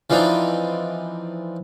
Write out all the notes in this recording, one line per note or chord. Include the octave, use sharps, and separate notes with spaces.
E3 F3 C4 D4 D#4